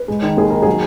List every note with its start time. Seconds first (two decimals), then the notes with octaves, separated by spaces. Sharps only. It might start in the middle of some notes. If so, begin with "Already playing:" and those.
Already playing: B4
0.08 G#3
0.22 D#3
0.37 D#2 G#4
0.50 D#4 A#4
0.62 F#3 G#4